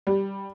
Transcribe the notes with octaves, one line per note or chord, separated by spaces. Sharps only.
G3